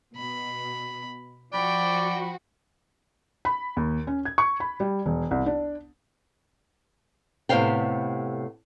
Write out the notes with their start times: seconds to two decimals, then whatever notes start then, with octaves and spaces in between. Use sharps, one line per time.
0.17 B2 B5
1.53 F3 F#4 D5 G5 B5
3.45 B5
3.77 D#2
4.07 C#4
4.25 G#6
4.38 C#6
4.60 B5
4.80 G3
5.06 E1
5.31 C2
5.46 D4
7.49 A2 C3 B3 G4 F5 G5